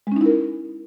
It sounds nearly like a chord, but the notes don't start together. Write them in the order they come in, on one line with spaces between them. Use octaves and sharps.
G#3 C#4 D#4 E4 A#4